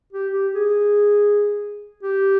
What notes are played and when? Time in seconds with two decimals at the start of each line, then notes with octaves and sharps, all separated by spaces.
0.12 G4
0.33 G4
0.55 G#4
2.03 G4